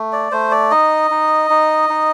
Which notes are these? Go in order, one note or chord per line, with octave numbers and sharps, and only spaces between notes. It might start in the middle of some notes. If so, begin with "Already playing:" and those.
Already playing: A3
D5
A3 C5
D5
D#4 D#5
D#4
D#4
D#4